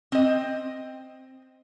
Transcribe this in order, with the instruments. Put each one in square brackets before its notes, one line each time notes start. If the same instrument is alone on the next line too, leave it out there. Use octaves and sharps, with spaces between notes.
[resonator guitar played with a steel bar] C4 D#5